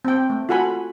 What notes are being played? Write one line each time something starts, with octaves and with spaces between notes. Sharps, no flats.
C4 G5
A3
F4 F#4 A4 F#5 G#5 B5